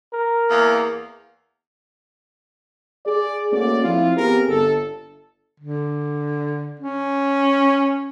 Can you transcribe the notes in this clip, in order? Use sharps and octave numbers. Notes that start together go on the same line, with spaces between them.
A#4
E2 A#3
G#4 D5
A3 A#3 C#4 F#4 G#4 D5
F3 C4 E4 F4
B3 C4 G4 G#4 A#4
G1 A4
D3
C#4